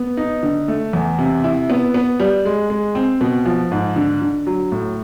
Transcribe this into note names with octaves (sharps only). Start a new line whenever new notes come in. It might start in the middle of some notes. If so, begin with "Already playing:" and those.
Already playing: B3
D#4
D3
A3
E2
C3
E4
B3
B3
G3
G#3
G#3
C4
B2
F3
G#2
D3
D3
F#3
A2